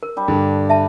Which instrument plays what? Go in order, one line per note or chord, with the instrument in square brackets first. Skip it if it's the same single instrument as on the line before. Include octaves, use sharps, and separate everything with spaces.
[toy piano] A#4
[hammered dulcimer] G3 D4
[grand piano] G2 D3
[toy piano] E5 A5